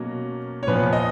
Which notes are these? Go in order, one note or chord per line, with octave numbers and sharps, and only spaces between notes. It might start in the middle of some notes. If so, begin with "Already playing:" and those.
Already playing: B2 F#3 A#3 C#4
C#5
A#2 F3 B3 B4
D#5